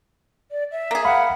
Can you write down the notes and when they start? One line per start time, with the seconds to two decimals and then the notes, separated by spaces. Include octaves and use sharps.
0.51 D5
0.72 E5
0.91 A#3 G#4
1.05 F5 F#5 B5